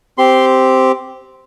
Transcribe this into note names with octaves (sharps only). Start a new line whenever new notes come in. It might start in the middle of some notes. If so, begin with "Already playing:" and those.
C4 G4 C6